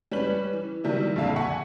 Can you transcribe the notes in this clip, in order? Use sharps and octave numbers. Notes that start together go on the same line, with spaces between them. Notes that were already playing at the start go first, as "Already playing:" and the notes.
G3 C#4 B4 F#7
E3
D#3 F#3 G3 E4
A#1 F2 D3 E5 F5 A5
E5 F#5 G#5 C#6 B6